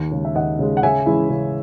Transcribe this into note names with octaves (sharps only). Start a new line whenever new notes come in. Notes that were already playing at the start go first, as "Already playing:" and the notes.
Already playing: D#2
C#3 G#3
E5
D#2 D#5 F#5
C#3 G#3
F#5
C#3 E5 G#5
E3 G#3 C#4 E4
C#3